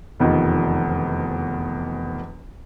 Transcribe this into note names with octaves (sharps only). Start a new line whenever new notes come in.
F1 E2 D#3 F3